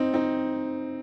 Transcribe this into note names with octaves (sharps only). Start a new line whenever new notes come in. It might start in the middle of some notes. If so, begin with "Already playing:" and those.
Already playing: C4 D#4
C4 D#4